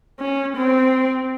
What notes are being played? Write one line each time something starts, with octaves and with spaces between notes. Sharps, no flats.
C#4
C4